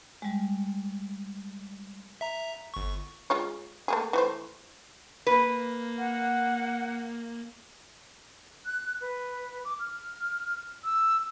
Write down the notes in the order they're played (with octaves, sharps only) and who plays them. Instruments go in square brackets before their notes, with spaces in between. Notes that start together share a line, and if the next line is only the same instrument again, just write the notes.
[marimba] G3 G#3
[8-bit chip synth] E5 A#5
G1 C#6
[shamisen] G#3 F4 C#5
A3 A#3 G#4
E3 A3 C5
[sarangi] A#3 [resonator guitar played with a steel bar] B4
[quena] F#5
[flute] F#6
B4
D6
F6
E6